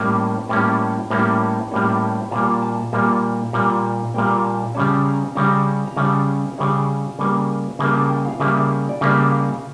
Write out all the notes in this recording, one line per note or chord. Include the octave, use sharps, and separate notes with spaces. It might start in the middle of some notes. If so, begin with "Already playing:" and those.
Already playing: A2 G3 A#3 C#4
A2 G3 A#3 C#4 A5
A2 G3 A#3 C#4
A2 G3 A#3 C#4
A#2 G3 A#3 A5
A5
A#2 G3 A#3 A5
A#2 G3 A#3
A#2 G3 A#3 G5
A5
C#3 G3 C#4 A5
A#5
C#3 G3 C#4 A#5
A#5
C#3 G3 C#4 A5
C#3 G3 C#4
C#3 G3 A#3
C#3 G3 A#3 A5
A5
G5
F5
C#3 G3 A#3 E5
D5
C#3 G3 A#3 E5
F5